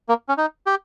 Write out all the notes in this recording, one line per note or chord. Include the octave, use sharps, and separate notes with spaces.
A#3
C#4
D#4
G4